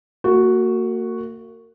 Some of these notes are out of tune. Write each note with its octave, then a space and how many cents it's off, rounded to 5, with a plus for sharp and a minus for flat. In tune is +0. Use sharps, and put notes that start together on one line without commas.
A#3 -35 F#4 +0